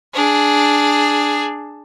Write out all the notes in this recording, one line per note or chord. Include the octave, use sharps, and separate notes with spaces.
D4 G#4